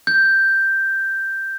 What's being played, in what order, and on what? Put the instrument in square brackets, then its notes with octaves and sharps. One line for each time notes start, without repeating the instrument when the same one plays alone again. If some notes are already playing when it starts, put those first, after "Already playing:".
[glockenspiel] G6